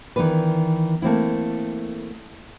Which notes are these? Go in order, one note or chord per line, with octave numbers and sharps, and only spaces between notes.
D#3 E3 B3 D4 B4
A3 A#3 C4 E4